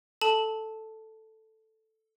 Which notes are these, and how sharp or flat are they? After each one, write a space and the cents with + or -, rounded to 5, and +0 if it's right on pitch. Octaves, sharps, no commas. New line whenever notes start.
A4 +0 A5 +0